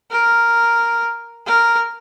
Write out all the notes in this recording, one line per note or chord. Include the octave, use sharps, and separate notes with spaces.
A#4
A#4